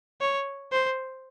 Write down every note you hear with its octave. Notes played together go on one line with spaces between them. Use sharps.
C#5
C5